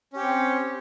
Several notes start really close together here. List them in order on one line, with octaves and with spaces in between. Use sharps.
C#4 G4 C#5 C4